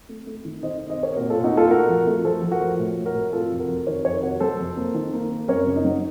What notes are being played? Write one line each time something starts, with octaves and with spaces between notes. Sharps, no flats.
A3
A3
D#3
D#3 C5 D#5
C3
C5 D#5
C3 A#4 C#5
A#2 F#4 A#4
A#2 F4 A4
D#4 F#4
A#2
F4 A4
A3 F#4 A#4
F3
A3
F3 A4 C5
F3
F#4 A#4
F3
A2
A2
F#4 A#4
A2
C3 F4 A4
F2
F#4 A#4
F2
D#3 A#4 C#5
F2 A#4 C#5
C3 F#4 A#4
F#3 A4 C5
F2
A#3
D#3
A#3
A#3
F#2 A#4 C#5
C#3
D#4
F#3